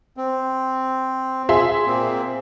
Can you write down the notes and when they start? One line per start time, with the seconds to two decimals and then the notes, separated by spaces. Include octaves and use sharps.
0.17 C4
1.49 G#4 E5 C6
1.87 A#2 A#3 C4